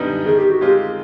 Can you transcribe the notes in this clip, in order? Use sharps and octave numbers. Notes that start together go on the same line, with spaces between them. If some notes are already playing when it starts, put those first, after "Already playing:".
Already playing: F#2 D3 G3 B3 D#4
D#3 G#4
G4
F#4
G#3 C4 F4 G4